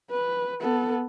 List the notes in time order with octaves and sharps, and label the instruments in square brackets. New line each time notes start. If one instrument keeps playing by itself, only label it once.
[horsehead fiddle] B4
B3 A4